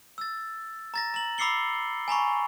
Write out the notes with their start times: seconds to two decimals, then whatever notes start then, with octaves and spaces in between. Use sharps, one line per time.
0.18 E6 A6
0.94 A#5 A6 A#6
1.14 A#5 F#7
1.38 B5 D6 E6 C7 C#7 G7
2.08 G#5 A#5 B5 C#6